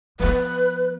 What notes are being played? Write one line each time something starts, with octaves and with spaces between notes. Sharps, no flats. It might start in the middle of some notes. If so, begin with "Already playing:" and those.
F3 B3 B4